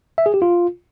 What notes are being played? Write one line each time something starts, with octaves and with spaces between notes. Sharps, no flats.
E5
G#4
G4
F4